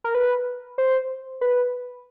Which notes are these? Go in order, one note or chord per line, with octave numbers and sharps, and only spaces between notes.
A#4
B4
C5
B4